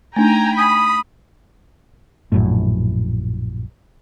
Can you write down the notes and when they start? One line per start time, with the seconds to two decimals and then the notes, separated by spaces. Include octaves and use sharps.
0.16 A3 D4 D#4 G5 G#5 A#5
0.58 B5 D#6
2.32 A#1 F#2 A2